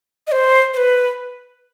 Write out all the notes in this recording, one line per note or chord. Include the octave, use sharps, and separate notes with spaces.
D#5
C5
C5
B4